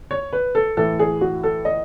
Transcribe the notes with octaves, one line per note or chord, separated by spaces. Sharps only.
C#5
B4
A4
A2 E3 A4
G#4
F#4
A4
D#5